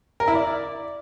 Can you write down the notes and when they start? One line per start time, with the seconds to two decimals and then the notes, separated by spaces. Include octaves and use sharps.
0.20 A#4
0.28 E4
0.35 D5